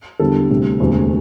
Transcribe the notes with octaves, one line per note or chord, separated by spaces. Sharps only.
E2 D3 G3 A4
D2 C3 G3
E1 D2 C3